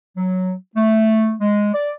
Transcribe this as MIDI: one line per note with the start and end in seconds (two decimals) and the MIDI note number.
0.17 0.54 54
0.76 1.34 57
1.40 1.73 56
1.74 1.91 74